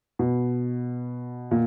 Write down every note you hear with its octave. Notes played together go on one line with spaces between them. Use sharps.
B2
A#2